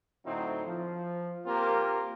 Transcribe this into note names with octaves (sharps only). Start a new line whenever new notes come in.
A2 D3 F#3 C4 D#4 E4
F3
A#3 C4 F4 G4 A#4